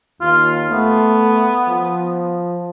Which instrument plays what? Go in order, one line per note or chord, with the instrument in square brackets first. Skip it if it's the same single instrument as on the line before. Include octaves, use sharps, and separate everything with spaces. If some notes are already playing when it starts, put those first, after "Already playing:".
[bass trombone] D#2 [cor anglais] F4
[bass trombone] A3 [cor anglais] B3
[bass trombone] F3